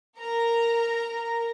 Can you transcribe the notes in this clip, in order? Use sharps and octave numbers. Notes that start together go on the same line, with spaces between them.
A#4 A#5